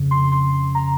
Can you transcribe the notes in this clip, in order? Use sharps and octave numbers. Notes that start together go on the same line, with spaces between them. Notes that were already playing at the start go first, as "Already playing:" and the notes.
Already playing: F2 C#3
C6
C6
A#5